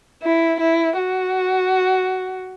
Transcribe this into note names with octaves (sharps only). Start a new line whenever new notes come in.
E4
E4
F#4